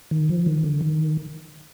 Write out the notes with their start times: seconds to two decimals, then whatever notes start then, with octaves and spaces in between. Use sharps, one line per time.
0.11 D#3
0.29 F3
0.46 D#3
0.63 D3
0.81 D#3